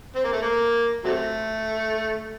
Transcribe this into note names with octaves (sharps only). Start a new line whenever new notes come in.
C4
A#3
A3
A#3
C3 F#3 A3